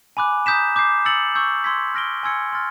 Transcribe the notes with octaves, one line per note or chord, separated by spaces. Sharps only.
G#5 B5 D6 F#6
A#5 D#6 G6 B6 E7
D6 G6 C7
E6 A6 C#7 F#7
C#6 E6 G6
C6 E6 G#6 B6
F6 A#6 D7 G7
G#5 C6 E6 G#6 C#7
C6 F6 A6